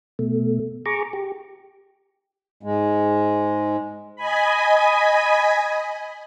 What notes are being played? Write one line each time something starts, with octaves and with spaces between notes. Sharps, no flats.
B2 A3
G#4 A#5 C#6 D6
G4
G#2 G#3
D#5 G#5 B5